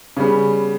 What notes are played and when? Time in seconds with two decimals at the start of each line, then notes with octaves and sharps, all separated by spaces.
0.17 C#3 G3 B3